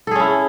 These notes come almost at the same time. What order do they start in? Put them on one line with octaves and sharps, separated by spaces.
A4 G#4 C#4 E4